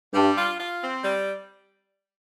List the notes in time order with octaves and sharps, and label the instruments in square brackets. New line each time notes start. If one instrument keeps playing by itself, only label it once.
[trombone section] G2 [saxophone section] G3
[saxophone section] F4
F4
C4
G3